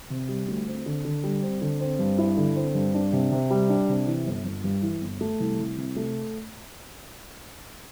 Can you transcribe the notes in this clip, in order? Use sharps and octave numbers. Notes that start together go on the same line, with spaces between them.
C3
G3
D2
C4
D3
D3
G3
C4
D3
C4
G2
E4
D3
C4
G2
D4
C3
C3
G3
D4
C3
E3
G1
G1
G2
E3
G1
A3
C2
C2
C3
A3